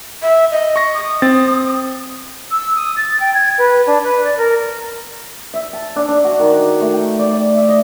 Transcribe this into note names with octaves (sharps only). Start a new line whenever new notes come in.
E5
D#5
C#6 A#6
D#6
C4 A6
E6
D#6
A6
G5
G#6
B4
D4
B4
D5
A#4
E5
A5
D4
D4
F#4
D#3
A3
G5
D5
D5
E5
D#5